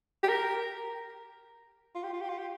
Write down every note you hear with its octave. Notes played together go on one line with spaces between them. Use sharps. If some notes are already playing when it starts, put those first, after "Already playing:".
G4
A#4
F4
G4
F4
G4
F4
G4